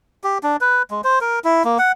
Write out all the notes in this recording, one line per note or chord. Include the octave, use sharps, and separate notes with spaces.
G4
D4
B4
G#3
C5
A#4
E4
A#3
F#5